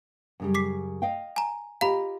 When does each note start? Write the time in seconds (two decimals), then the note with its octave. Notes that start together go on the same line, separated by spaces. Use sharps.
0.40 F#2 C#3 G3
0.55 D6 B6 C7
1.02 D#5 F5 G5
1.36 G#5 A#5
1.81 F4 G4 D#5 F5 A#5 B5